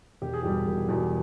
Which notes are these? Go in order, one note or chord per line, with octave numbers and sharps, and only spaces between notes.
E1 G4
G#4
E2 B2 G3 G4
E1
E2 B2 G3